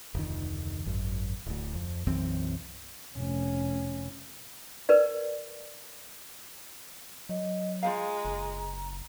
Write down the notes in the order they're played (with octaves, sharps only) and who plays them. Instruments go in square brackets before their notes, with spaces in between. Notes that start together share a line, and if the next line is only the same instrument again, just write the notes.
[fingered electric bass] F1 D2 D#3
G#1 F#2
D1 D2
F2
B1 F#2 E3 C4
[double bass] F1 C#4
[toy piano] A#4 B4 D5
[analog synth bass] F#3 [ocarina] D#5
[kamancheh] G#3 [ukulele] F4 C5 F5 [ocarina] A#5
[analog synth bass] F#1